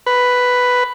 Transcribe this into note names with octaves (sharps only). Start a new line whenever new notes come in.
B4